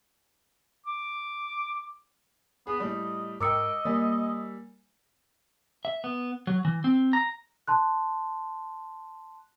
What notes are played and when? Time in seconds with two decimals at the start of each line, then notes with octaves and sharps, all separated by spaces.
0.86 D6
2.67 B3 G#4
2.80 A2 G3 D#5
3.41 G#2 A#4 D#5 G5 D6 E6 C#7
3.85 G3 A#3 G#5
5.85 E5
6.04 B3
6.47 F#3
6.65 E3
6.84 C4
7.13 A#5
7.68 A5 C6 F#6